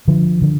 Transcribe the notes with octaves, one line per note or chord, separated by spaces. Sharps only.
D3 F3
D3